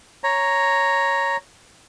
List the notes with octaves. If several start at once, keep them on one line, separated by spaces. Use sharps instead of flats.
C#5 A#5